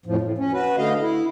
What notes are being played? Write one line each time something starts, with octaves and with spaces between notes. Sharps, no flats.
F2 A2 F3
A2
C#4
F#4 B4
D3 A3 D#5 F5
E4